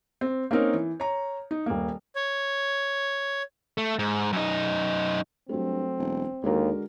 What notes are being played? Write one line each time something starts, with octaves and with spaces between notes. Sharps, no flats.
C4
A#3 C4 C#4 D#4 A#4 C#5
E3
C#5 A#5
D#4
D#1 A#3
C#5
A3
G#2
F#2 D#4
G2 F#3 A3 C4
E1
D#2 D3 G#3 F#4 A#4